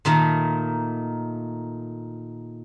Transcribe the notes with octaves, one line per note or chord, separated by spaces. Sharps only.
A#2 D#3 A3 A#3